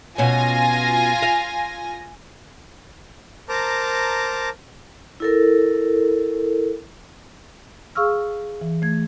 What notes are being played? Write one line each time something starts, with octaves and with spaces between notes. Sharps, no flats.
B2 C#4 F4 G#5 A#6
F5
A#4 C5 A5 A#5 D6
E4 A4 A#4
G#4 F5 C#6 E6 F6
E3
A3 G#6